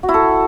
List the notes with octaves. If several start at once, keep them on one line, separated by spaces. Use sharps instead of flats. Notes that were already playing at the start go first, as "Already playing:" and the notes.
F#4
E4
A4